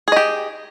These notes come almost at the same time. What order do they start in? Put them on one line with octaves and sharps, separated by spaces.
G#4 D#5 G4